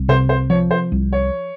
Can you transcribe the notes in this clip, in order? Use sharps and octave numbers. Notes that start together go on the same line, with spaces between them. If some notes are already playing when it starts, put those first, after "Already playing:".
Already playing: C2
C3 C5
C5
F3 C#5
C5
C2
C#5